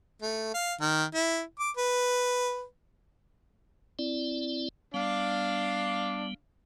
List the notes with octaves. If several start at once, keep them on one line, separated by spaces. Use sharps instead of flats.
A3
F5
D#3
E4
D6
B4
C4 E4 D5
G3 B3 D4 F5